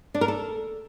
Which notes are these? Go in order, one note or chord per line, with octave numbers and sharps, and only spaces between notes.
D4
A#4
A4